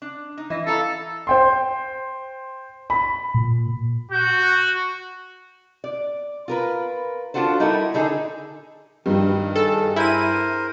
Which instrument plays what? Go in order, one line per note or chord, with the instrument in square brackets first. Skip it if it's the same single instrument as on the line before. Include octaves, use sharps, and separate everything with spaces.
[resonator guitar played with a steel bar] D4
D#4
[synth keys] E3 D#5 A#6 [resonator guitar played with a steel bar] E5
[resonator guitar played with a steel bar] E4 F5 A#5 [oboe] A4
[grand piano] C5 G5 C6
B5
[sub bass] A#2
[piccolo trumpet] F#4 [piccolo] G6
[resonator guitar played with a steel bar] D5
F4 A#4 B4
D4 F4 F#4 A4 C5
G3 D#4 E4 A4 A#4
D3 D#4 G#4 A4
[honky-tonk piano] G2 G3 [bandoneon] D#3
[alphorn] G#4 [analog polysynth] A4
[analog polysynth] E4 D#7 [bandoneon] A#4 C5